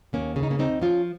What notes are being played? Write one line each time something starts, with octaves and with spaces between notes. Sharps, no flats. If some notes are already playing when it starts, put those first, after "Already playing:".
D#2 A#3 C#4
C#3 C#4
D#4
A#3 C#4
D#2 C4 D#4
F3 C#4 F4